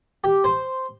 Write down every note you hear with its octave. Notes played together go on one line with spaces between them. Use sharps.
G4
C5